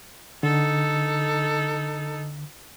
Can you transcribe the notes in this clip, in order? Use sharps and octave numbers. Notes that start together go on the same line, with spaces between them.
D3 D#4 A4